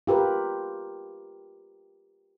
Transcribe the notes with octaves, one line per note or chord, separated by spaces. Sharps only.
F4 G4 A#4 B4